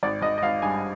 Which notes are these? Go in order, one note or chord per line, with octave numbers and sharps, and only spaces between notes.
G#1 D5
G#1 D#5
D#5
G#1 F5
G2 G#5